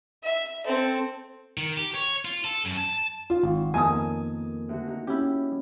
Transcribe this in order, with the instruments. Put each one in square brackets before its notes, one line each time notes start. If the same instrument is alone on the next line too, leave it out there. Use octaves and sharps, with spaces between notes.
[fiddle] E5
C4 A4
[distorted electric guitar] D#3
G4
C#5
F4
A4
F#2
A5
[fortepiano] F4
[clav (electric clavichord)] G#1
[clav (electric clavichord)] F2 D#3 [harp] A#3 B3 [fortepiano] G#5 A5 D#6
[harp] D2 F#4
D#4 F#4
[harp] C#4 [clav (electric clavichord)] E4 G4